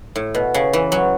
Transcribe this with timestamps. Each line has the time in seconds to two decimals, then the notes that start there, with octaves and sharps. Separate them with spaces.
0.16 A2
0.35 B2
0.54 C#3
0.73 E3
0.92 F#3